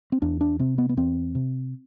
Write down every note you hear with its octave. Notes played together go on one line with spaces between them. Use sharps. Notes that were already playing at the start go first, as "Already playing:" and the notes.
C4
E2 D4
D4
C3 C4
B3
B3
E2 C4
C3